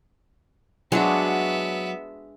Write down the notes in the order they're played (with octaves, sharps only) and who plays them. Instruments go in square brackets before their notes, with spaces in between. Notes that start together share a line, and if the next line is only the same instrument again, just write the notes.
[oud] F#3 [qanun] G#3 D4 F#4 [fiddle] B3 E5